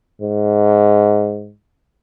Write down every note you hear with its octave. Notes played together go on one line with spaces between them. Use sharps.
G#2